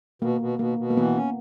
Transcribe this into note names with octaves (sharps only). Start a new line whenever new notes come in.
B2 A#3
B2
B2 A#3
B2
A#3
E3 B3
C#4